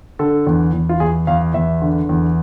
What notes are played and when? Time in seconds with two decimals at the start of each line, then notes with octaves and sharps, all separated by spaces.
0.19 D3 A4
0.47 E2
0.73 E2
0.89 F4
1.00 E2 G#4
1.27 E2 F5
1.54 E2 E5
1.82 D3
2.09 E2